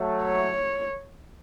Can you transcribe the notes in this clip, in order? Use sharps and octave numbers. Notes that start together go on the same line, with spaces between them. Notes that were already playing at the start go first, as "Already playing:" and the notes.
Already playing: F#3 A3
C#5